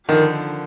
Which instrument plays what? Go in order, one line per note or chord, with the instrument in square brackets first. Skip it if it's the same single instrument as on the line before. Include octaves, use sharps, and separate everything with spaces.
[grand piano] D3 F3 [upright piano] D#3